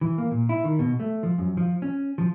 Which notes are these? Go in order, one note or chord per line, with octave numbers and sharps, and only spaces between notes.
E3
A#3
A#2
E4
D#3
B2
A3
F3
F#2
F3
C#4
F3